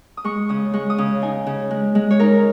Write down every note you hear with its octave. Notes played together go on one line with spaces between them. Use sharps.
D#6
G#3 C#6
C#3 D#6
G#3 C#6
D#6
C#3
D#4 G#5
C#3
G#3
G#3
C#5
D#4 A#4